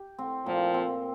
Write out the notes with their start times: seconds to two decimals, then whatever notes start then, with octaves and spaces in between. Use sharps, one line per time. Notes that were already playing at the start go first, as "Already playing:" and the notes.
Already playing: G4
0.19 C4
0.46 A#2 F3
0.74 C4